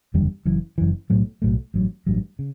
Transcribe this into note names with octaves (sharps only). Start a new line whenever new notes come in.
F#1 E2 D3 G3
F#1 F#2 E3
F#1 F#2 E3
B1 A2 F#3 A3
B1 A2 F#3 A3
A1 G2 F#3
A1 G2 F#3
C#3